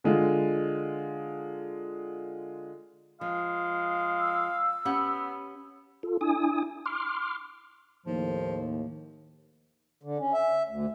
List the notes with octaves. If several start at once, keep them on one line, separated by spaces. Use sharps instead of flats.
D3 G#3 F4
F3 G#3 F5
E6
B3 C#4 G4 F#5
F4 A4
D4 E4 G#5 D#6
C6 D6 F6
D#2 A2 F3
D3
C#4
E5
D2